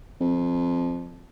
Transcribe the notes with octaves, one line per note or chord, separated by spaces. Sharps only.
F2